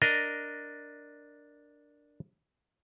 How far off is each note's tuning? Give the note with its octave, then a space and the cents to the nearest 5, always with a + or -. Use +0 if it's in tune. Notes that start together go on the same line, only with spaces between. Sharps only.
D4 +0 A#4 -5 D#5 +0